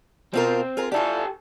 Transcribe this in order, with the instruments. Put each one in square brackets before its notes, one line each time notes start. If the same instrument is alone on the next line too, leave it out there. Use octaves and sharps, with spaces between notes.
[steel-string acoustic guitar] B2 F4 A#4 [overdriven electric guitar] C4
[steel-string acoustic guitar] F4 G#4 A#4
[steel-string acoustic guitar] D4 E4 F4 [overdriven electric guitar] G4 A4